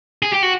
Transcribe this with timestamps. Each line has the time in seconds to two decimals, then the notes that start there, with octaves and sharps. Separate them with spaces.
0.22 G#4
0.32 G4
0.43 F#4